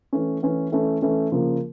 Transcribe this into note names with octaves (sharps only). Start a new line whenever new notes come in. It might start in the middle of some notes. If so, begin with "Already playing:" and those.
E3 A3 C#4
E3 A3 C#4
E3 A3 C#4
E3 A3 C#4
C#3 F3 A#3